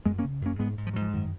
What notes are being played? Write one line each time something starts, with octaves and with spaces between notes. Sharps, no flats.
F#2 G#3 B3
A#3 C#4
C#3
F#2 A#3 C#4
G#2 G#3 B3
G#2
F3
G#2 F#3
F3
F#2 D#3